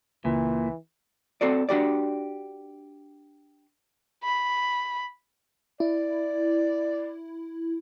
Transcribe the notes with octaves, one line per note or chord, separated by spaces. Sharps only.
C#2 A#2 E3
C4 F#4 A4 D5
D4 F#4 G4 D5
B5
E4 D5